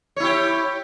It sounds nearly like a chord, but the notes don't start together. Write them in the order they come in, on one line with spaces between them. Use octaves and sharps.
C#5 E4 G4